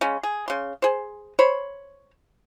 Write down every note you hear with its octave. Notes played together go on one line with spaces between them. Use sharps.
C#3 G#3 C#4
G#4
C#3 C6
G#4 C5
C5 C#5 B5